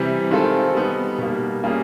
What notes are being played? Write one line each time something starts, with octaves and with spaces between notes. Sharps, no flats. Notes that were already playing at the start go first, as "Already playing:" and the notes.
Already playing: C3 E3 G3
D#3 G#3 C4 F4 A4
G3 B3 D#4
B2 G3 A#3
G3 A#3 C#4 F4 G#4